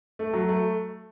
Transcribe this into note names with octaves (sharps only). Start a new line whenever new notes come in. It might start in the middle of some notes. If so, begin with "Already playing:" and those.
A3
F#3
A3